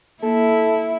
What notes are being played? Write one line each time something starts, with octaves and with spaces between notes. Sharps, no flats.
A#3 E4 A4